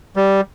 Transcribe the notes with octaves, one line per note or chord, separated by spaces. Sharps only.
G3